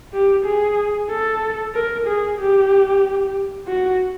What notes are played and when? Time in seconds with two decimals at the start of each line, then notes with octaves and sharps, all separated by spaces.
0.13 G4
0.45 G#4
1.10 A4
1.74 A#4
2.07 G#4
2.39 G4
3.67 F#4